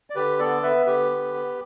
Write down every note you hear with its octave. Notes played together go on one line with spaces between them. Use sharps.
D5
D3 G4 B4
B3 A4 D5
B3 B4 E5
D3 G4 B4
B3
B3